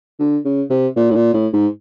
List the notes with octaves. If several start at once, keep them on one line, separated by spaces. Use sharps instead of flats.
D3
C#3
C3
A#2
A2
A#2
A2
G#2